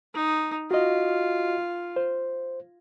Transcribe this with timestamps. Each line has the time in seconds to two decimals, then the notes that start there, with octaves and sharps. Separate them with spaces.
0.14 D#4
0.71 F4 F#4 D#5
1.96 C5